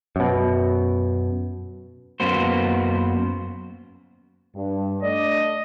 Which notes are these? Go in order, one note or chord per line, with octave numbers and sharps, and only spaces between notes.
F#2 B2
F#2 A#3 B3 F#4 C5
G2
A3 D4 D5 D#5